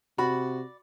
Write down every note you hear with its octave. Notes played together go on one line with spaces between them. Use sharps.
C3 F#4 D5 B5